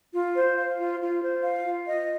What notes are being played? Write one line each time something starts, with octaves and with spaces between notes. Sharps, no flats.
F4
C5
F5
F4
F4
C5
F5
F4
D#5